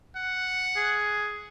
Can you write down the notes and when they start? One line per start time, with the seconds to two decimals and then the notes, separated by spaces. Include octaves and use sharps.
0.16 F#5
0.76 G#4